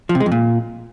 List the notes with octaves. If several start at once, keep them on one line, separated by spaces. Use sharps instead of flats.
F3
C3
G#3
F2
A#2